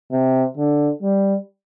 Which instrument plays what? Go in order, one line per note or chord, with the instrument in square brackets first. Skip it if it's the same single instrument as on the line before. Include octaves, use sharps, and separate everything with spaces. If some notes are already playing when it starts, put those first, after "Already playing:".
[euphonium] C3
D3
G3